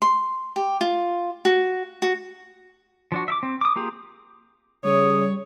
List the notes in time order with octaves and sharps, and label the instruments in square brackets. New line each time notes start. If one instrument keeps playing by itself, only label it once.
[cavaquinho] C6
G4
F4
F#4
F#4
[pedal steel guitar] F3 D4 F#4
E5 D6
C4
D6 D#6
A#3 F4 G4 G#4
[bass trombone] C#3 [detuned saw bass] G3 [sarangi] C#5 [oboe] D#6